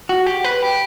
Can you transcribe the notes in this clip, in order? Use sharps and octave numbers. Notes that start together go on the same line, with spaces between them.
F#4
G4
B4
G4